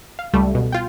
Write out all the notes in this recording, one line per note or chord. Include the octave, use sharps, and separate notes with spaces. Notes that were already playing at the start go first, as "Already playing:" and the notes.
F5
C#2 G3 A3
B2
F4 G5